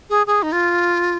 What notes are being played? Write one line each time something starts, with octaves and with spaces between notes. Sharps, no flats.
G#4
G#4
D#4
F4